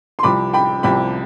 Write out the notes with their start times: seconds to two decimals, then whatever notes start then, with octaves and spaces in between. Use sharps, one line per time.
0.19 C6
0.23 C2 C3 F3 B5 D6
0.53 G5 B5
0.83 C2 C3 F3 G5 B5